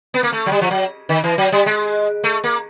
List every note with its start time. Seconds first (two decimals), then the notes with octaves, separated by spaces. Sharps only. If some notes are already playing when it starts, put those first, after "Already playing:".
0.14 B3
0.23 A#3
0.32 A3
0.46 F#3
0.52 G3
0.61 F3
0.71 F#3
1.09 D#3
1.24 E3
1.38 F#3
1.52 G3
1.66 G#3
2.24 A3
2.44 A#3